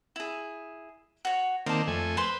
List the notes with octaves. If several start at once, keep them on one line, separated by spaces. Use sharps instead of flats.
E4 G#4
F#4 C#5
D#3 A#3 C4 D5 A5
F2 A3 G#5
B4 C5 B5 C6